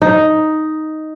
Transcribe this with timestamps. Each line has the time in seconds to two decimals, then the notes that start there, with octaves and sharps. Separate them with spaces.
0.02 D#4